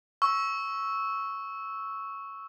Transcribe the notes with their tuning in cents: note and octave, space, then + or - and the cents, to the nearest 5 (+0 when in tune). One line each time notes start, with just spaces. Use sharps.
C#6 +0 E6 -5